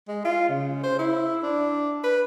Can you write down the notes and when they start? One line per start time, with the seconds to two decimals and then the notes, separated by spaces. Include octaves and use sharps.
0.08 G#3
0.25 F4
0.49 C#3
0.83 C5
0.99 E4
1.43 D4
2.03 B4